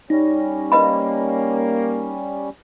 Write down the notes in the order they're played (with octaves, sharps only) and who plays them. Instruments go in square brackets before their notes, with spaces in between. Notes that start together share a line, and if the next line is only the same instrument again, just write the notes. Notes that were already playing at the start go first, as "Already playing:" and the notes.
[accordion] G3 C#4 [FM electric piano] D#4
[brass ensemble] A#3 [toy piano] B4 D#5 B5